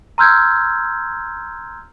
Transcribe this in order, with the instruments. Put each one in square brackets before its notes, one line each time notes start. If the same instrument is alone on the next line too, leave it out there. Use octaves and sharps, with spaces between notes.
[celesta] A#5 C6 E6 F6 G6 G#6